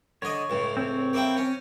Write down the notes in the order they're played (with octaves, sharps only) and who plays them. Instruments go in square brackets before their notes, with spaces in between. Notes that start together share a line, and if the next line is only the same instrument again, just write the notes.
[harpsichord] D3 D#5 [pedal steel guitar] C#5
[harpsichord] C#2 A2
[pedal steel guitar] C4 C#5
[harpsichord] A#3 E4 G5
C#4